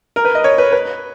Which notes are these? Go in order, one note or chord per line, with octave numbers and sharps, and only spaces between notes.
A#4
B4
D#5
C#5
B4
B4